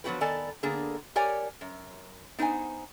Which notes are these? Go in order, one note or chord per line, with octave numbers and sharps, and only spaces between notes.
F3 F#3 B3 F#4 G4 B4
D#3 B3 A4 D5 G#5 A5
D3 A#3 B3 G#4
G4 A#4 C#5 D5 F#5 G#5
F#2
B3 D#4 C5 F#5 G#5